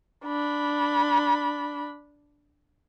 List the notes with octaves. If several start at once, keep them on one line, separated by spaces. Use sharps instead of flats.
D4 B5